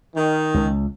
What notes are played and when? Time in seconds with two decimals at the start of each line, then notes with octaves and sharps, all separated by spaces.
0.15 D#3
0.54 C#2